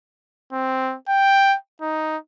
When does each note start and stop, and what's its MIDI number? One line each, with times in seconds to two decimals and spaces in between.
0.53 0.96 60
1.09 1.56 79
1.81 2.17 63